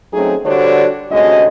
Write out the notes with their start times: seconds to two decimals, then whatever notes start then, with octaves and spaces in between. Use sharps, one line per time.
0.13 F#3 A3 C4 C#4 D#4 G#4
0.45 D3 G3 D4 F#4 C5 C#5
1.11 D2 C3 G#3 C#4 F#4 D#5